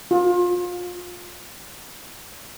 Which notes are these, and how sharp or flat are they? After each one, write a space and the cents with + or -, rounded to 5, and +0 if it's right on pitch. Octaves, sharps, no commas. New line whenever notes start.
F4 +25